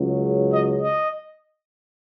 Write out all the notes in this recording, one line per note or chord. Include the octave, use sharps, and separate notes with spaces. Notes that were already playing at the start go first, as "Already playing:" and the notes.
Already playing: C#2 C#3 F#3
D#5
D#5